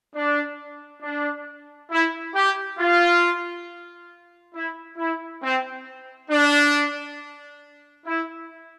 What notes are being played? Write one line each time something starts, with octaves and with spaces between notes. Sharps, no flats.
D4
D4
E4
G4
F4
E4
E4
C4
D4
E4